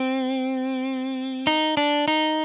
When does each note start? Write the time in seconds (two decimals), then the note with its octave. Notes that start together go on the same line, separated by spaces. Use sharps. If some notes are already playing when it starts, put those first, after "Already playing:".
Already playing: C4
1.47 D#4
1.77 D4
2.08 D#4